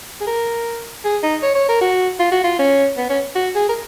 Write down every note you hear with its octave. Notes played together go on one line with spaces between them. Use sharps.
G#4
A#4
G#4
D#4
C#5
C#5
A#4
F#4
F4
F#4
F4
C#4
B3
C#4
F#4
G#4
A#4